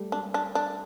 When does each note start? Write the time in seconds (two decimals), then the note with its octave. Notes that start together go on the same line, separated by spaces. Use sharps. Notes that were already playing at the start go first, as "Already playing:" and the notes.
Already playing: G3 A3
0.12 G3 D4
0.34 D4
0.55 D4